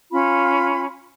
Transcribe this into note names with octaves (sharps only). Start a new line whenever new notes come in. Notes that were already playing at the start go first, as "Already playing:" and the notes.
C#4 F4 B5